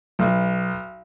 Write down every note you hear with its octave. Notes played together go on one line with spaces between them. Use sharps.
B1